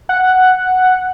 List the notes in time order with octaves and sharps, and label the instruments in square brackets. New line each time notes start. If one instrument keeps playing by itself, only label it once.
[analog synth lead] F#5